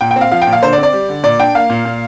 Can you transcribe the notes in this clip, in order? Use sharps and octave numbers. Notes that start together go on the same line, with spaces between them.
A#2 G5
G5
C4
F5
F3 F5
G5
A#2
F5
D3 C5
D5
C4
D5
G3
D3
A#2 D5
D4 G5
A#3 F5
A#2
A#2